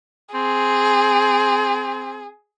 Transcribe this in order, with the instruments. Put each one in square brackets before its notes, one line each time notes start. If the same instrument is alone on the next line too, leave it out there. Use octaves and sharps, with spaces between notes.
[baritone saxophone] C4 [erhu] G#4